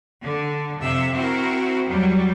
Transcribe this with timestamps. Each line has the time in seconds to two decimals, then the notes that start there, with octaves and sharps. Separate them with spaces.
0.24 D3
0.79 F2 C3 E5
1.14 C4 E4 F#4 A#4
1.88 E2 F#3 G3